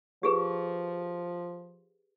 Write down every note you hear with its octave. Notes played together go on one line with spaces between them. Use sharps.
F3 G4 G#4 B4